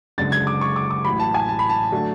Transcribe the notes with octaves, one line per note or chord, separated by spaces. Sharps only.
F#1 F#2 D3 G#3 A6
G#6
D6
C#6
D6
D6
A1 A2 F#3 B5
A5
G#5
A5
B5
A5
D3 F#3 A3